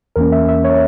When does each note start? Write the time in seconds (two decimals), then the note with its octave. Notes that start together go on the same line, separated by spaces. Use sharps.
0.16 E2 E3 A#3 C#4 A#4
0.32 E5
0.48 E5
0.64 C#5